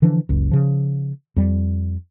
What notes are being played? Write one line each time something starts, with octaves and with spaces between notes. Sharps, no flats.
D3 E3 F3 D4
F#1 C#2
C#3 F3
F2 G3